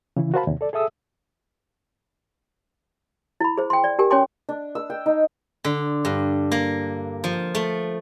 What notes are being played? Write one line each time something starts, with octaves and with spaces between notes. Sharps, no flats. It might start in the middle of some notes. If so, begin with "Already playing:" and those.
C#3 E3 E4
F#4 A#4 C5 F5 A5 B5
D#2 C3
A4 D5
G#4 A4 E5 D#6 E6
E4 B5
G#4 C5
G5 C6
D5
G4 A#4 G#5
C#4 C#5 G5 G#5 C6 D6
D4
E6
G5
D#4
D3
G2
A#3
F3
A3